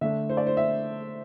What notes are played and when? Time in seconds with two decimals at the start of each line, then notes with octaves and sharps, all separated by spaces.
0.01 D3 A3 D4 E5
0.29 C5
0.37 D5
0.47 C5
0.57 E5